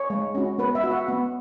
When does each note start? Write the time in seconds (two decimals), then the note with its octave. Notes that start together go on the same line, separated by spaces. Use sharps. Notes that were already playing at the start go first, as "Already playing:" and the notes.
Already playing: C#5
0.10 G#3
0.35 C#4 F#4
0.58 B3 B4
0.75 E5
0.84 F#4
0.91 F#5
1.08 B3